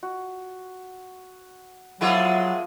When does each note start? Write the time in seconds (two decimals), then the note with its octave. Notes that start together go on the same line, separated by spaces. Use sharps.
0.03 F#4
2.01 F3 F#3 G#3 A#3 B3 E4 F4